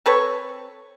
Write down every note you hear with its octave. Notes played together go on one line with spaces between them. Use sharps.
C4 A4 B4 C#5